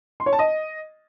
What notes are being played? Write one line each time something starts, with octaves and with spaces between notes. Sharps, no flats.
C6
C#5
A5
D#5